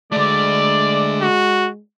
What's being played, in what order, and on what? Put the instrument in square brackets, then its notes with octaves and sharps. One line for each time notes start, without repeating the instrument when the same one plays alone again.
[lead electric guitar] D3 A3 [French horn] G#3 [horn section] D5
[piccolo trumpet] F#4